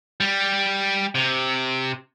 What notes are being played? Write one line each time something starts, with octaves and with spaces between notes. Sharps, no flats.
G3
C3